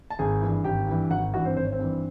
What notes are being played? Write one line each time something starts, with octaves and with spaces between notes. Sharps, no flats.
A5
G#1 G#4 G#5
G2 E3
G#1 G4 G5
G2 E3
G#1 F#4 F#5
G2 E3 F#4 F#5
C4 C5
G#1 C5
C#5
C4 C5
G2 E3